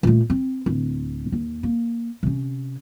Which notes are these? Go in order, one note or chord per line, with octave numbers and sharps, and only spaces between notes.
A#2 A3
C4
D1
D#2
A#3
C3 C#4